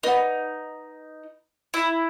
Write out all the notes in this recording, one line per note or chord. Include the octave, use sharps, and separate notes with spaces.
D#4 B4 D5 F#5
E4